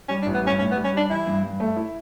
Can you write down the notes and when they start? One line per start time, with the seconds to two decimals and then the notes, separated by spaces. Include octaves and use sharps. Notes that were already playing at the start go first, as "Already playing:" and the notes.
0.09 G3 C#4
0.22 D4
0.26 A1
0.34 B3
0.43 G2 C#4
0.59 A2 C#4
0.71 B3
0.76 G3
0.85 C#4
0.93 G3 D4
1.09 E3 E4
1.27 G2
1.44 G2
1.60 A3
1.76 E4